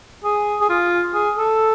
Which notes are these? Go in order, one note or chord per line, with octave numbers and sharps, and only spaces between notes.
G#4
G#4
F4
G#4
A4